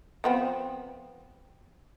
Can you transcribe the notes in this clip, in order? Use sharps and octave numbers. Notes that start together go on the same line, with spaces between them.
F3 B3 C4